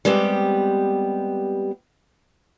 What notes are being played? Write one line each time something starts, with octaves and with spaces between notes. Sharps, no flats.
G3 G#3 B3 C4 G4